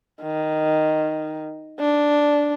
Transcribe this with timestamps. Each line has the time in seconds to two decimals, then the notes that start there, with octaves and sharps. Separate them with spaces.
0.22 D#3
1.80 D4